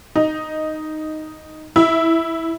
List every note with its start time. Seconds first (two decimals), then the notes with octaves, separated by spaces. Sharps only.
0.16 D#4
1.76 E4